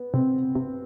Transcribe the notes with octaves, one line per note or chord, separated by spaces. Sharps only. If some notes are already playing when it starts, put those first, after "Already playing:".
Already playing: B3
C3 C4
C3